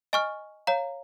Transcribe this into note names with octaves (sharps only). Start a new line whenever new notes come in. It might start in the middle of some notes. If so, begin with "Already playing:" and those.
D#5 G#5 C#6 F6
C#5 F5 A#5